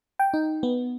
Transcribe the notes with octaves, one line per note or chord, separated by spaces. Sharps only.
G5
D#4
B3